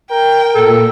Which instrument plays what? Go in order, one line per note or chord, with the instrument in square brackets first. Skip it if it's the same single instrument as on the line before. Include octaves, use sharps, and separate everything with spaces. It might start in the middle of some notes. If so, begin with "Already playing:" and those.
[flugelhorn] A#4 [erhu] G5
[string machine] A#2 [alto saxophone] A4